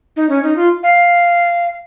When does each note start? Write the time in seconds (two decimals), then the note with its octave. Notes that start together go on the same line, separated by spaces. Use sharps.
0.16 D#4
0.29 C#4
0.43 D#4
0.56 F4
0.83 F5